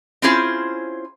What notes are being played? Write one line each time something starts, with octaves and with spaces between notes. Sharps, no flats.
C4 C#4 E4 F4 G#4 C5